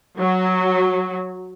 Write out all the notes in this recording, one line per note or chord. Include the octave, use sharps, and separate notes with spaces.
F#3